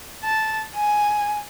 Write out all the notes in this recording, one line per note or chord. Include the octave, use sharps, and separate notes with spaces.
A5
G#5